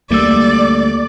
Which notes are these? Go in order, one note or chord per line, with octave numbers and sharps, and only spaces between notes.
D2 G3 A3 A#3 D5 E6